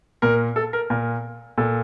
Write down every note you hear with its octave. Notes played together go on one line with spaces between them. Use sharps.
A#2 A#4
A4
A#4
A#2 A#4
A#2 A4